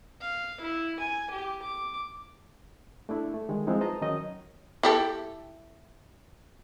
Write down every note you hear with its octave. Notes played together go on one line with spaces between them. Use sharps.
F5
E4
G#5
G4
D6
A3 D4 E4
A3
D#3 G3 G#3
F3 G#3 C4 D#4 E4
B4 C5 D#5 A5 A#5
D#3 F#3 C#4 D#4 C#5 D#5
E4 G4 A4